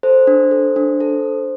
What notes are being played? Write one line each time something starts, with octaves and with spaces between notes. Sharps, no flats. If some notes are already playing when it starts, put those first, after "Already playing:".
A4 C5
D4
A4
D4
A4